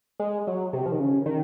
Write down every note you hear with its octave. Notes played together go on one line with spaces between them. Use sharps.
G#3
F#3
C3
F3
D#3
C#3
D#3